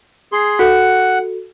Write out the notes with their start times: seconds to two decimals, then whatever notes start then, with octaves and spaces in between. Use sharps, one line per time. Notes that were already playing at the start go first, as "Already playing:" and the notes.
0.32 G#4 C6
0.59 F#4 A4 F#5